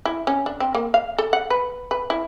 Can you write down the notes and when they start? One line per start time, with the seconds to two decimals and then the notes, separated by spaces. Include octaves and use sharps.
0.06 E4
0.27 C#4
0.46 D4
0.60 C4
0.75 A#3
0.94 F5
1.18 A4
1.33 F#5
1.50 B4
1.91 B4
2.10 E4